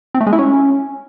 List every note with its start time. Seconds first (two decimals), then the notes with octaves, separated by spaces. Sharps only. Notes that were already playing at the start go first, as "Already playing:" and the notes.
0.15 C4
0.21 A3
0.27 G#3
0.33 E4
0.39 C#4